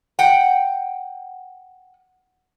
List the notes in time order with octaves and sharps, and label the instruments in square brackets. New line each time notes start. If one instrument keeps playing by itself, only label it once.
[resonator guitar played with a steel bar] F#5 G5